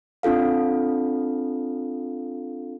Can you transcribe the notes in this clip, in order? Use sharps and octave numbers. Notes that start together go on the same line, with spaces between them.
C4 D4 F4 A4 F5